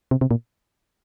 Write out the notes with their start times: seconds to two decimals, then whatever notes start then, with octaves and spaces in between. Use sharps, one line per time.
0.11 C3
0.21 C3
0.31 A#2